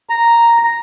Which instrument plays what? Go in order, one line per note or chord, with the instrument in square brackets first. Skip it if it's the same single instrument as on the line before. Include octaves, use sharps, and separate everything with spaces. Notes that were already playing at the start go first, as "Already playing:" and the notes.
[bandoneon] A#5